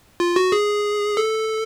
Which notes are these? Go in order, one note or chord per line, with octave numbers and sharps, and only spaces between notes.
F4
F#4
G#4
A4